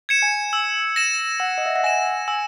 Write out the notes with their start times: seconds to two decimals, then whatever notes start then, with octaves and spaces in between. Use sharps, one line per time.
0.09 G#6 C#7 E7
0.22 G#5
0.53 E6
0.96 A#6 E7
1.40 F#5 E6
1.58 D#5
1.66 E5
1.76 F#5
1.84 G#5 A#6 E7
2.28 G#5 E6